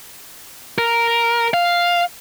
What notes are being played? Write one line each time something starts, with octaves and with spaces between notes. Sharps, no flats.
A#4
F5